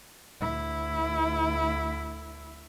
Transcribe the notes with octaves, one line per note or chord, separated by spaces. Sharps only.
D2 E4